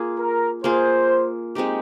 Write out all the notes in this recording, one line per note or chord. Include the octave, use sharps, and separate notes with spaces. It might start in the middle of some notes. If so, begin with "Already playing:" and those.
Already playing: A#3 F4 G#4
A#4
A#3 F4 G#4 C5
G#3 C4 D#4 G4